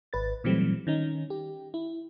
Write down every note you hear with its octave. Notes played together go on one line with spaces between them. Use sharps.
G#1 B4 A6
A#2 E3 F#3 G3 A3 C4
D#3 C#4 D#4
G4
E4